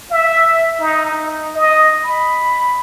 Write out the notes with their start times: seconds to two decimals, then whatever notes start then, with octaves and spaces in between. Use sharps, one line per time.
0.11 E5
0.80 D#4
1.12 D#4
1.55 D#5
2.04 B5